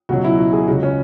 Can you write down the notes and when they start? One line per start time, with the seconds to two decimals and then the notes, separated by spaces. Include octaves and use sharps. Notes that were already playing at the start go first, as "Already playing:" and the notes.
0.09 C#2 B2 F#3 F#4
0.24 E4
0.39 F#4
0.53 G#4
0.68 C#2 C#3 G#3 F#4
0.83 C#4